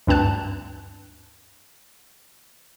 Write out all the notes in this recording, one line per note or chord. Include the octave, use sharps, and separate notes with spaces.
D2 G2 C4 A5 F#6